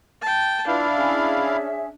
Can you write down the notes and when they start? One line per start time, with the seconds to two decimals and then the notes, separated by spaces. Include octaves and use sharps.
0.22 G5 A5
0.67 D4 E4 F4 B4 F5
0.96 C#4 G#4 E5